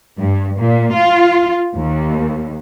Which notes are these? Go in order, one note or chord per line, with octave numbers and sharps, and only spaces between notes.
G2
A#2
F4
D#2